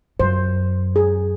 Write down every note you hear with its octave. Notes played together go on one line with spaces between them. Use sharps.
F#2 C5
G#4